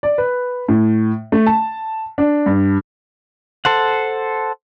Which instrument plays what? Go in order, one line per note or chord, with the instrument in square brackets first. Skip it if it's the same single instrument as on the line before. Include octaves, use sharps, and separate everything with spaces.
[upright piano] D5
B4
A2
A3
A5
D4
G2
[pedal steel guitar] A4 C5 F#5